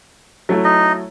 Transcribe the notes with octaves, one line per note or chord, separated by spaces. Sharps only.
F#3 A3 E4
D#4 D#5